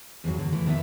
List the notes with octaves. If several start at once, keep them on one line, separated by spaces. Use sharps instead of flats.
E2 G2 F#3
D3
E3 A3
F2 D#3 E3 B3 E5